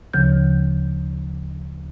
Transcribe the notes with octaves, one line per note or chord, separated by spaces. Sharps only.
D2 C#3 F3 G6